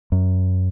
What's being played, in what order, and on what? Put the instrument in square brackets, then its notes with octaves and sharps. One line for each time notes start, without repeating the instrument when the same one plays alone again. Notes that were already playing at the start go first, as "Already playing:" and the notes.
[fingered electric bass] F#2